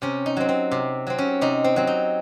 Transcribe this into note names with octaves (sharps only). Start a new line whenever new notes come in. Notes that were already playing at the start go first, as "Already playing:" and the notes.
C3 C#4
D#4
F#3 C4
C4
C3
F#3 C4
C#4
C3 D#4
C4
F#3 C4
D#4